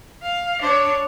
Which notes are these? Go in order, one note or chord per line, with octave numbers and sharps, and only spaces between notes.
F5
D4 C#5